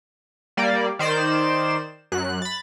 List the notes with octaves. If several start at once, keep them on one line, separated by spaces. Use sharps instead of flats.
G3 A#3 D5
D#3 C5 D5 E7
F#2 F#6
B5 A6